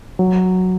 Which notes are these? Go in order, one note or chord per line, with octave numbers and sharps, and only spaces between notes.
F#3